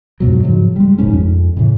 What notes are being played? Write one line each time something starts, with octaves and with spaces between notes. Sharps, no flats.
F2 G#2 B2 F#3
G#2 C#3 F3 F#3
G3 G#3
F1 A#1 G#2 C#4
F2
A2 C#3 E3